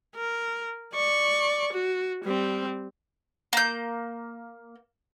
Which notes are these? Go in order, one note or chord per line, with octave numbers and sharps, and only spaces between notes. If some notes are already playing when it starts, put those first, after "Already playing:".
A#4
D5 C#6
F#4
G3 C4
A#3 G6